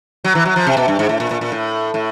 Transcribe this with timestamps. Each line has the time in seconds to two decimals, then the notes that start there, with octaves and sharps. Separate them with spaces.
0.24 F#3
0.35 E3
0.45 F#3
0.56 F3
0.67 C3
0.77 B2
0.88 G2
0.99 G#2
1.09 A2
1.20 A#2
1.31 A#2
1.41 A#2
1.52 A2
1.94 A2